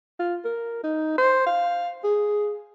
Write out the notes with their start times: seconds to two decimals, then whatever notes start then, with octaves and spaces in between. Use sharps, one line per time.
0.20 F4
0.45 A#4
0.84 D#4
1.18 C5
1.47 F5
2.04 G#4